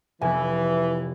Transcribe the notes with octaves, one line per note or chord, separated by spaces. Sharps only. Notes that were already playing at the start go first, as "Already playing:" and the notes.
F1 E3 G#5